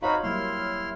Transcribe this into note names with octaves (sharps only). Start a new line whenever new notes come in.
D#4 F#4 C5 C#5 F5 B5
F#3 G3 A#3 E4 C6 F6